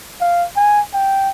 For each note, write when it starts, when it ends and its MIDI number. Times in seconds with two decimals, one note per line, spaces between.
0.21 0.45 77
0.56 0.81 80
0.94 1.30 79